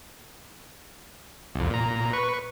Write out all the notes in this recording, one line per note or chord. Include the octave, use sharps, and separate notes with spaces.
C2 F2
A#2 A#5
B4 C#6